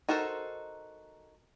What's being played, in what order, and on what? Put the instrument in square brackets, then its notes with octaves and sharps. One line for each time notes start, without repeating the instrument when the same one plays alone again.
[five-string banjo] D#4 F#4 A4 A#4 C5